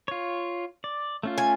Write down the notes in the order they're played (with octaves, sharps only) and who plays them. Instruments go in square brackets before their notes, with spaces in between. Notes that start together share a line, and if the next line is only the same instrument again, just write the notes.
[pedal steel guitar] F4 C#5
D5
A3 C#4 F4
[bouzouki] G#5